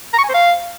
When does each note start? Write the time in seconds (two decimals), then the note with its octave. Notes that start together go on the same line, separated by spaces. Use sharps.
0.13 A#5
0.18 C#6
0.24 G#5
0.29 C5
0.34 F5